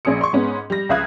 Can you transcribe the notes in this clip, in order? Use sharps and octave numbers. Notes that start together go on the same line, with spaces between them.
A#1 C#4 G#4 D#6 C#7
C6 C#6
G#2 G#3 B3 C#4
G3 A#6
C#2 E5 F5 D#6 F#6 G#6